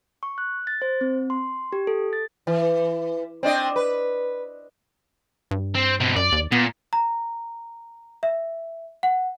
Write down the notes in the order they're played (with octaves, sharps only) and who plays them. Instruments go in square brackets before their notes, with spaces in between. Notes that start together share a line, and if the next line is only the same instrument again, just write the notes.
[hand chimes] C#6
F#6
A6
C5
C4
C6
G4
A4
A6
[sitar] E3
C4 D4 D#5
B4
[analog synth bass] G2
[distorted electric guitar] C4
B2 C4
[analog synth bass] F#2 [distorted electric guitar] D5
[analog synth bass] D#2
[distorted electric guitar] A#2 [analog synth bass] B3
[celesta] A#5
E5
F#5